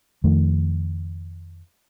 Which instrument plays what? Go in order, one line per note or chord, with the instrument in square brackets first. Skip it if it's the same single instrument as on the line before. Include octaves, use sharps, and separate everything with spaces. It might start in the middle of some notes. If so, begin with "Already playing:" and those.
[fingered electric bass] F2 D#3 A3